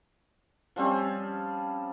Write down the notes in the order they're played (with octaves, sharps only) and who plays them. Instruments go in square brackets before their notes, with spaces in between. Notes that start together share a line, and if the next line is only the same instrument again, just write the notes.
[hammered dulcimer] F3 G3 C4 C#4